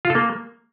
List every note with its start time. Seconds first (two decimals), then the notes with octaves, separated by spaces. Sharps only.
0.05 F4
0.10 A4
0.15 A#3